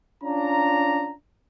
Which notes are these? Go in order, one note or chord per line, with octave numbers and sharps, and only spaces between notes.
C#4 D4 F4 A#5